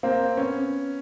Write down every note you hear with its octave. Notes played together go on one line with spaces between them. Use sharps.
A#3 C4
B3 C#4